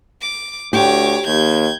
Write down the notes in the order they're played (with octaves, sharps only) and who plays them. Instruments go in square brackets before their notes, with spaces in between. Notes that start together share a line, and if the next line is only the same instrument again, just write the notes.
[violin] D6
[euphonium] D2 [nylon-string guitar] G4 [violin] C#5 D6
[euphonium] D#2 [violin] G6 G#6